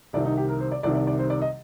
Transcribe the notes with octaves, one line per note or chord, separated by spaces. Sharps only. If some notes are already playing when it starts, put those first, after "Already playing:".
C2 C3 D#3 D5
D#4
G4
A#4
C5
D5
C2 C3 D#3 D5
D5
D5
C5
D5
D#5